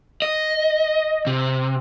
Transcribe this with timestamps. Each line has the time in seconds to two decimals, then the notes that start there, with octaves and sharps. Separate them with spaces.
0.22 D#5
1.27 C3